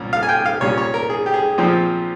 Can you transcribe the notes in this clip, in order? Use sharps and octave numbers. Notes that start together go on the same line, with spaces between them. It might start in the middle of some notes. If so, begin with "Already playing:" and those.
Already playing: C2 A#2 C#4
F5
G#5
G5
F5
C2 A#2 G3 C#4 C#5
C#5
A#4
G#4
G4
G#4
A#1 A#2 F3 C4